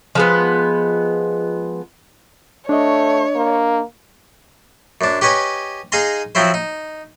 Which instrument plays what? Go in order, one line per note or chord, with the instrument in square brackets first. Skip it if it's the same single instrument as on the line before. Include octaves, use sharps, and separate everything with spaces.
[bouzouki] F3 G#3 B3
[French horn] A3 [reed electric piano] D4 D#5 [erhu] C#5
[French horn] A#3
[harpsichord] F#2 D4
G4 B4 C#5 D#5 G#5
D#4 G#4 F5 G#5 A#5 C6
F3 F#3 C4 E4 C5
D#4